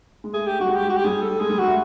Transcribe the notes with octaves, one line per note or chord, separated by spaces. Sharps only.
G#3
A3 G#4
G4
G3 F#4
G#3
G4
F#4
G4
G3 G#4
A4
G#3 G#4
G3
G#3 F#4
A3